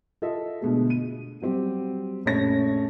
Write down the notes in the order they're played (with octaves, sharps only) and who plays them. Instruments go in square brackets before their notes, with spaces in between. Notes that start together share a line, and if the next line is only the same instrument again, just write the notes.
[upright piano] F4 A4 D#5 E5
B2 D3 G#3 A3
D#7
F#3 G3 C4 G4
A#1 F#2 A3 C#5 A#6